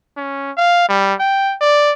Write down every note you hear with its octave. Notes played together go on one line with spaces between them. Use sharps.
C#4
F5
G3
G5
D5